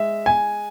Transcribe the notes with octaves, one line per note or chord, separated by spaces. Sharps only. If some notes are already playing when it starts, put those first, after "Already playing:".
Already playing: G#3 E5
G#5